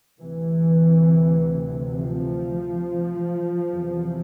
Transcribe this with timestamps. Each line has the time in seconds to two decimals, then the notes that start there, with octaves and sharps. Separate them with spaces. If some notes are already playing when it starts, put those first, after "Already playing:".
0.20 D2 C3 E3
1.95 F3
3.70 E2 C3